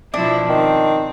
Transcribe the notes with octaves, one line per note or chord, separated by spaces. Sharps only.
B2 F3 D4 E4
D#3 C4